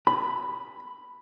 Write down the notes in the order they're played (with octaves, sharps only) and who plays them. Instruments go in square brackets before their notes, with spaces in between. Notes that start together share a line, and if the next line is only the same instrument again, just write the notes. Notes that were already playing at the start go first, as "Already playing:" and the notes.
[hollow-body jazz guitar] B5